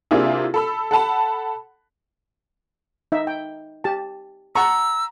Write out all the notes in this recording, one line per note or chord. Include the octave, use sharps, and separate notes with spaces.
C3 A#3 D4 E4 F4 G#4
A4 B5 E6
A4 F#5 A5 B5
D#4 E5
G5
G4 A5
F#5 A5 A#5 C#6 E6